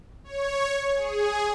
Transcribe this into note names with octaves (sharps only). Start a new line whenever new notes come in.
C#5
G#4